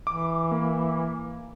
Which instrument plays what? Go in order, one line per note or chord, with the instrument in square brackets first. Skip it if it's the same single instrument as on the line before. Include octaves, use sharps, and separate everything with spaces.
[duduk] E3 [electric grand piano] D6
[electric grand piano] A#3